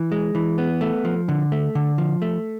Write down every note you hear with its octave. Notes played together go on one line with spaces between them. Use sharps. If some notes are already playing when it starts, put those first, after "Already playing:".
Already playing: E3
G#3
E3
B3
A3
F3
D3
A3
D3
F3
A3